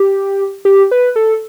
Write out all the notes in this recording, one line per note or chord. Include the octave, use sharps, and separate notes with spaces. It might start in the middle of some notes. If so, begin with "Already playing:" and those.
Already playing: G4
G4
B4
A4